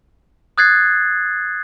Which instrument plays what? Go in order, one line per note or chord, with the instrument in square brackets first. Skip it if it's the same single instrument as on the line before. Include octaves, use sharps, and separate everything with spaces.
[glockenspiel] D#6 F#6 G#6 A6 C7